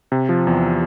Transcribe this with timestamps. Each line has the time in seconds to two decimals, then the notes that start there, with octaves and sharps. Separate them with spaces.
0.12 C3
0.29 F3
0.47 E2